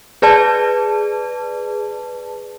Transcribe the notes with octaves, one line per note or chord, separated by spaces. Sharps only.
G#4 B4 D5 A5